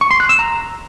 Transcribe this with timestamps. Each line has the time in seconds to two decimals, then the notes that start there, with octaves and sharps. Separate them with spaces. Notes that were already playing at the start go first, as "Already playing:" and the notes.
0.01 C#6
0.11 C6
0.20 F#6
0.29 E6
0.39 A#5